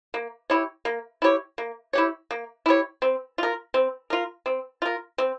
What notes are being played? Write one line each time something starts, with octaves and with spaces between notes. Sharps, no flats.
A#3
E4 G4 C#5
A#3
E4 G4 C#5
A#3
E4 G4 C#5
A#3
E4 G4 C#5
C4
F4 A#4
C4
F4 A#4
C4
F4 A#4
C4